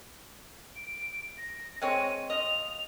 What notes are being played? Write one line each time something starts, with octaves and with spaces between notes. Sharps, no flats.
D7
A#6
G#3 C4 C#5 D#7
F4 D#5 F7